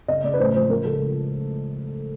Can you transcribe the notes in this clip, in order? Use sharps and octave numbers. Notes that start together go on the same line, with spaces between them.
C#3 D#5
C#3 D5
B4
A1 C5
F3 C5
F3 A#4
C#2 A4